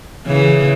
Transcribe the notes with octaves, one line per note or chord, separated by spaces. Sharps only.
C#3 E3